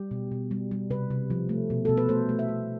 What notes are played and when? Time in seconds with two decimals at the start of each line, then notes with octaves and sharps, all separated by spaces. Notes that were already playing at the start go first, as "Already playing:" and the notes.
Already playing: G3 G4
0.11 B2
0.32 B2
0.51 G3
0.71 G3
0.90 C3 B4
1.10 C3
1.30 F3
1.49 A3
1.70 B2
1.85 B2 A4
1.97 B4
2.09 A3 C5
2.29 A3
2.39 E5
2.49 A3